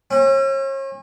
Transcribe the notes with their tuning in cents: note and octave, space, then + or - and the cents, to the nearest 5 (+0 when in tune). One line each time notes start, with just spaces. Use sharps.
C#4 -40